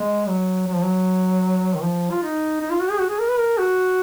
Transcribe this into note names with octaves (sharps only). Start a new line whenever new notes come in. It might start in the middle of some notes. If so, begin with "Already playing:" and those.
Already playing: G#3
F#3
F#3
F3
F#3
D#3
F3
F4
D#4
D#4
F4
F#4
G#4
F#4
G#4
A#4
B4
A#4
F#4